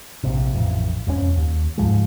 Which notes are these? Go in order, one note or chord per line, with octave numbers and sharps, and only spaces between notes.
A#1 C3
A1 F2
E1 F2 E3 C#4
D#2
C#2 G#2 F3 G#3